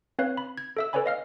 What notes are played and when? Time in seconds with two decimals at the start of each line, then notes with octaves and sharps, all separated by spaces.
0.19 C4 B4 C#5 F5 F#6
0.37 B5
0.58 G#6
0.77 A4 E5 E6
0.93 A4 B4 C#5 D5 G#5 B5
1.06 D#5 F5 F6